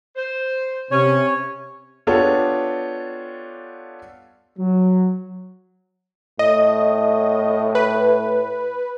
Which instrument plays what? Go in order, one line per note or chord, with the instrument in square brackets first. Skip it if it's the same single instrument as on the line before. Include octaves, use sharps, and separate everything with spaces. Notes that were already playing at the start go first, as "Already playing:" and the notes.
[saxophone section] C5
[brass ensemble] C3 [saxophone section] C#4 [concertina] C#5
[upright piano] B3 D4 F4 G4 A4 C#5
[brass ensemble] F#3
[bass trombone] A2 [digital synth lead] D#5
[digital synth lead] B4